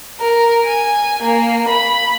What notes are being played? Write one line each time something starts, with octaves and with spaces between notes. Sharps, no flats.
A#4
G#5
A#3
B5